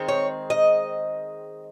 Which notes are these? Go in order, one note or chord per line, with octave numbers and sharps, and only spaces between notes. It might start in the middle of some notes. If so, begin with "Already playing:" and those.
Already playing: D#3 G#3 C4
C#5
D#5